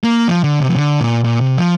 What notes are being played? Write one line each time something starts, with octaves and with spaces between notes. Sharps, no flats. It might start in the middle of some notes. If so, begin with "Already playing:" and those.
A#3
F3
D3
C3
F3
D3
A#2
A#2
C3
F3